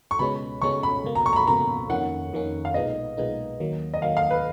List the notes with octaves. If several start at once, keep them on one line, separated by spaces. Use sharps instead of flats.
C#6
C#2 B2 G#3 C#4 B5
C#2 B2 G#3 C#4 C#6
B5
C#2 B2 A#3
A#5
C#6
A#5
B5
C#2 B2 A#3 A#5
F2 D#3 A#3 C#4 F#5
F2 D#3 A#3 C#4
F5
B1 A#2 G#3 B3 D#4 D#5
B1 A#2 G#3 B3 D#4
D#2 D#3 F#3 A#3
D#5
D#2 D#3 F#3 A#3 F5
F5
B4